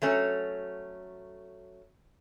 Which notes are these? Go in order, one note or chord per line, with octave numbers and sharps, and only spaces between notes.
F#3 A3 C#4